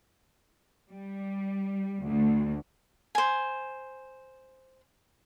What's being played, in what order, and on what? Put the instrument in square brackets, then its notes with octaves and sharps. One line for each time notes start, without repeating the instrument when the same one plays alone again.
[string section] G3
D2
[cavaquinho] C5 G#5